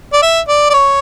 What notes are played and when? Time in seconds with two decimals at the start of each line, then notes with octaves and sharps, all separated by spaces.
0.13 D5
0.22 E5
0.48 D5
0.70 D5
0.74 C#5